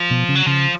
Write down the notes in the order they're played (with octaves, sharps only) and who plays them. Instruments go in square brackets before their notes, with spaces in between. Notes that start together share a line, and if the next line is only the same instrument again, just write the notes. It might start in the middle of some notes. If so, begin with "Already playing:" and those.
Already playing: [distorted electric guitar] F3
[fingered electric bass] B2 B3
C#3 C#4
[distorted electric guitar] F#3
[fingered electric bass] C#3 C#4 [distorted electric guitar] F3